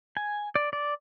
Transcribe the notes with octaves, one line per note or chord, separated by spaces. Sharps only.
G#5
D5
D5